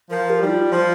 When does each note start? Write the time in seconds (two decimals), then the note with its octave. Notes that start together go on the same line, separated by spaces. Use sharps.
0.10 F3 A#4
0.30 G4
0.41 G3 D#4
0.50 F4
0.72 F3